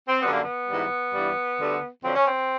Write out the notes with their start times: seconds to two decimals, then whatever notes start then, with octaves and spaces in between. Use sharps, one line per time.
0.08 C4
0.22 F#2 D3 G3 B3
0.32 A#3
0.43 B3
0.68 G#2 E3 G3
1.14 G2 E3 G3
1.60 D2 D3 G3
2.04 F2 D3 F#3 C4
2.15 C#4
2.26 C4